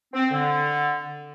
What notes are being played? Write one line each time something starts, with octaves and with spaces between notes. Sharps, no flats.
C4
D3